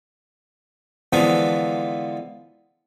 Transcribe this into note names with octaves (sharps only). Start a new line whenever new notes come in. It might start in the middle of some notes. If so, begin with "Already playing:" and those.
D3 E3 F3 G#3 B3 E4